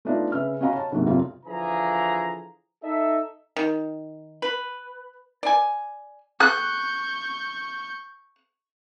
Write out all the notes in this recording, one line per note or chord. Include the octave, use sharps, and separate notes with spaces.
A3 B3 D4 D#4 F4
C#3 B4 E5 F6
C#4 F#4 D#5 F5 A#5 B5
C#5 A5
D2 G#2 C3 F#3 A#3
F1 F2 C3 F#3 F4
D3 E3 F3 G#4 A#5
D#4 A4 D#5 E5
D#3
B4
D5 G#5
C#6 F#6 G6